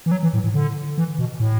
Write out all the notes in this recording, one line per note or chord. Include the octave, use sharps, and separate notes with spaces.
E3
F#3
E3
A2
A2
D3
E3
B2
A2